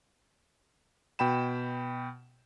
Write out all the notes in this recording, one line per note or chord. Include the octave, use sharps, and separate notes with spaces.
B2 G5 B5 E7